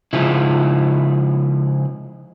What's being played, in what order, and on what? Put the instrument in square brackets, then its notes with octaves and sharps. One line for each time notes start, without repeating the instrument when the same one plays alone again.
[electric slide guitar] C#3 F3 G#3 E4